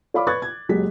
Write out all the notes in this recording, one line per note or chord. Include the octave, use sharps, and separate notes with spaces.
C#5 D5 F5 B5 D6
B4 B5 C#6 F#6 G#6 A6
G#6
F#1 F#3 G#3 G4 B6